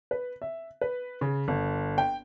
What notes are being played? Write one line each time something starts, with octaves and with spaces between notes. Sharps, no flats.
B4
E5
B4
C#3
G1
G5